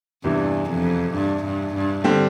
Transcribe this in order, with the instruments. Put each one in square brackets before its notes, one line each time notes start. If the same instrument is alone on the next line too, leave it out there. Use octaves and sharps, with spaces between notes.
[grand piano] E2 C3 E3 [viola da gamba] G2
[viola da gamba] F2
G2
G2
G2
[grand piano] D3 G3 C4